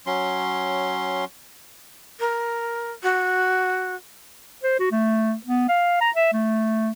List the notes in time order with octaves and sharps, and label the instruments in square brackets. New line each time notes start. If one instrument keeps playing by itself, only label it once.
[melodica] F#3 C#4 C6
[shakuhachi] A#4
F#4
[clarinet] C5
F#4
A3
B3
F5
A#5
E5
A3